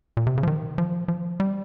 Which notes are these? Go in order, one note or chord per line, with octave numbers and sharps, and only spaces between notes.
A#2
C3
C#3
F3
D#3
F3
F3
G3